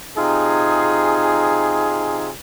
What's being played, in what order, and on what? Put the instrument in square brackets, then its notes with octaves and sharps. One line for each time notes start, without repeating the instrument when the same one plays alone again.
[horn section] C3 D#4 F4 G#4